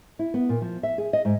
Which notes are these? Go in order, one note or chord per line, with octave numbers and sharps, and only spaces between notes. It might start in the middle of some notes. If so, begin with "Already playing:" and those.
E4
B3
A#2
F3
E5
G#4
D#5
G#2